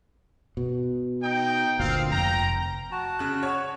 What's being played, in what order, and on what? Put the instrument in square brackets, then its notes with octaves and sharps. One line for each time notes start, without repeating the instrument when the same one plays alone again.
[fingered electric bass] B2
[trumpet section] D#4 G5
[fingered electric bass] G1 D2 A#2 [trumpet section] C4 F5
[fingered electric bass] F1 [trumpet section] G5 A#5
[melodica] F#4 A5
[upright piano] C#3 F#6
C#5